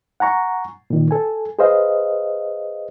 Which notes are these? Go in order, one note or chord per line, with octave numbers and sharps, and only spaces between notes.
F#5 G#5 A#5 C#6
A#2 D#3
A4 G#5
G#4 B4 C5 D#5 F5